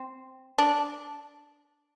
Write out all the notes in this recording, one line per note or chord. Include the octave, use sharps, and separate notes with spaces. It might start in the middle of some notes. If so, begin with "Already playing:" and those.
Already playing: C4
D4